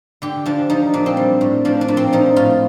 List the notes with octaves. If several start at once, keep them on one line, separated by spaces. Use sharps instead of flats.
D3 G4
F3 D4
F3 D#4
A#2 D4
C4
G3
A2
F3 D4
D4
A#2
C4
F3 D#4
A2 F4